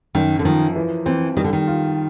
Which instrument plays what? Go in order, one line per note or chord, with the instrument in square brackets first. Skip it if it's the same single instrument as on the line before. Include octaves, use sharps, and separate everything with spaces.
[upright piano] F#2 [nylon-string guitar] D#3
[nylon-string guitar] D3
[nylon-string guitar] D#3 [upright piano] F3
[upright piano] E3
[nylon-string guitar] E3 [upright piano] C4
[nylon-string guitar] D#3 [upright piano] G3
[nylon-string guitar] D3
D#3
[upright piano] F4